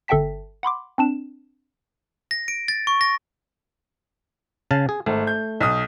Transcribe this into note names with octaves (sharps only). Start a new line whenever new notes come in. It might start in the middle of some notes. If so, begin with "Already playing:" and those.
G1 A4 E5 G5 A5 B6
F#5 B5 C6 D6
C4 D4 E7
A#6
D7
A6
C#6
A#6
C#3 F5 A5
G#4
G#1 A3
G6
B1 D#6